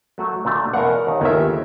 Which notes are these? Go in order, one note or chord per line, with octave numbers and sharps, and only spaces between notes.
F#3 A3 F#4
A#2 D3 A3
E2 B2 A#4 F5 F#5
D#2 D#3
G1 D#2 G#4 A#4 E5